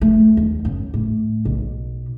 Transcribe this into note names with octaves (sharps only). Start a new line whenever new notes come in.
A3
D#2
F#2
A2
B1